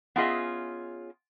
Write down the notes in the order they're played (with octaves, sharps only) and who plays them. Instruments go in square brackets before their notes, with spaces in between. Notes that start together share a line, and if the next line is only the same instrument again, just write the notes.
[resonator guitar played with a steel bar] B3 C#4 F4 G#4 D#5 E5